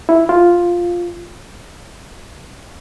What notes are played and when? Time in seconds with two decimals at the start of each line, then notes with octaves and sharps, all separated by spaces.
0.09 E4
0.29 F4